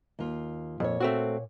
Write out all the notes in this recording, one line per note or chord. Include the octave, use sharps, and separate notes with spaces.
D#2 F4
F2 A#2 C#5
A3 C4 F#4